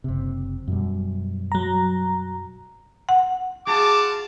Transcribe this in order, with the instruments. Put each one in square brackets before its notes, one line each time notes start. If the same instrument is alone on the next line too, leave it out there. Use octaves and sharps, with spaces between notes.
[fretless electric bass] F#1 C3
F#2 B2 G3
[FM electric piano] F#3 A#5
[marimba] F#5
[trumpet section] F4 F#4 A5 [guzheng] G#4 [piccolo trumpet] D6